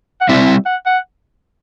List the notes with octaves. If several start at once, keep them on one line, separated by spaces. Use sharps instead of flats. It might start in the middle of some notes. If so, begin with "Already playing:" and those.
F#5
G3 C4 E4 E5
F#5
F#5